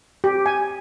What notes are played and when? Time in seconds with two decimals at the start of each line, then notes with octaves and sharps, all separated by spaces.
0.24 G4
0.46 G#5